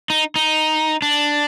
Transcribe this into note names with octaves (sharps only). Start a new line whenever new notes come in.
D#4
D#4
D4